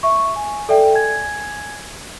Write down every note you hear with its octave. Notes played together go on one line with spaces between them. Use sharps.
E5 C#6
G#5
A4 D5 E5 G5
G#5 G#6